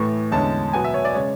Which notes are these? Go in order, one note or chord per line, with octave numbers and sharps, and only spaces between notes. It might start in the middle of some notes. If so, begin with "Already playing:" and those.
Already playing: A2 E3 A3 C#6
E2 D3 G#3 C#4 A5
B2 F#3 B3 G#5
E5
C#5
D5
C#3 G#3 C#5